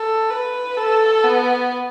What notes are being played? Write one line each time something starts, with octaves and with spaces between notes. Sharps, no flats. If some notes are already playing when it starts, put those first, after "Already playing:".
Already playing: A4
B4
A4
B3